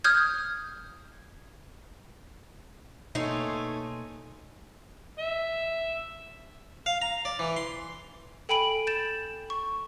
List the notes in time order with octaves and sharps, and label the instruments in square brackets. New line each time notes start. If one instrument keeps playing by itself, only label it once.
[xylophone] D#6 F6 G6 G#6
[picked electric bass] B2 A#3 [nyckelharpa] A3 G#5 [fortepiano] D#4 [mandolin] C#5 C6
[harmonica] E5
[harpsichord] F5
A#5
D5
E3
C6
[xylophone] A4 G5 G#5 B5 D7 F#7
G6 A6 E7
C#6